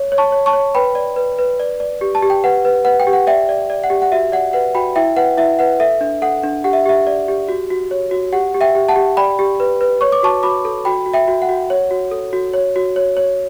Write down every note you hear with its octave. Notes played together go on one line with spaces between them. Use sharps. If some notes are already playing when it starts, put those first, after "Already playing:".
Already playing: C#5
C#5
A5 C#6
C#5
A5 C#6
C#5
B4 G5 B5
D5
B4
B4
D5
D5
G4
A5
G4
G5
B4 F#5
B4
B4 F#5
G5
G4
F#5
D5 E5 G5
D5
D5
F#5
G4
F#5
F#4 E5
D5 F#5
B4 F#5
F#4 G5 B5
E4 E5 G5
B4 F#5
E4 E5
B4 F#5
A4 E5
D4
A4 F#5
D4
G4 F#5
E5
G4 E5
D5
G4
F#4
F#4
C#5
F#4
G4 F#5
G4
E5 G5
G4
F#5 A5
G4
D5 G5 B5
G4
B4
B4
C#5 C#6
D6
F#4 A5 C#6
F#4 B5 D6
A4
F#4 G5 B5
F#4
E5 G5
F#4
F#5
F#4
C#5
F#4
A4
F#4
C#5
F#4
C#5
C#5